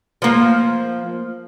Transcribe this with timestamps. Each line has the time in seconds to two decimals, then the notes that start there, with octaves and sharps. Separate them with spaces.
0.22 F3 A#3